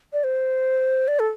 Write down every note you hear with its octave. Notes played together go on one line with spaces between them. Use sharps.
D5
C5
D5
A4